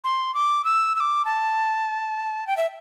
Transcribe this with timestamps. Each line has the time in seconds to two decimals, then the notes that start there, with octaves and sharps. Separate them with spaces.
0.04 C6
0.34 D6
0.65 E6
0.96 E6
1.00 D6
1.25 A5
2.47 G5
2.57 E5